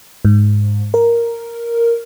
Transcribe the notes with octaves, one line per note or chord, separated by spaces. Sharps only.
G#2
A#4